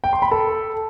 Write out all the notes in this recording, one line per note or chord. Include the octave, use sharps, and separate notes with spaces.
G5
C6
B5
A4